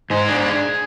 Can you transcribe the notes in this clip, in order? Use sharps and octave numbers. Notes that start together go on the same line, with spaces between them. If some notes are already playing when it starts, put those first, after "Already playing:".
G#2 G#4
D4